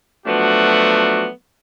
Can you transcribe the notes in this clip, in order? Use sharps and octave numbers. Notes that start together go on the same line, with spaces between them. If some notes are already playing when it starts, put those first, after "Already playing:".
F3 F#3 A3 B3 D4 F#4